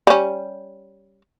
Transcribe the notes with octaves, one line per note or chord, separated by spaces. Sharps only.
G3 C#4